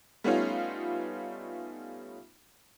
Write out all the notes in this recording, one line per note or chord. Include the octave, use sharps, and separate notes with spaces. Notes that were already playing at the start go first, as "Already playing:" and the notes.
G3 A3 B3 C#4 D#4 F4